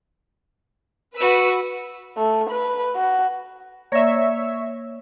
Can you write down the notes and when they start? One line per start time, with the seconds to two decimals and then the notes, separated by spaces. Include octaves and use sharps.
1.16 F#4 B4 E6
2.17 A3
2.50 B4
2.95 F#4
3.92 A#3 C#5 D5 E5 A#6